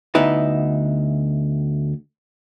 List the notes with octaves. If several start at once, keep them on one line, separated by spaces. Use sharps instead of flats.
D2 B3 D#4 E4 B4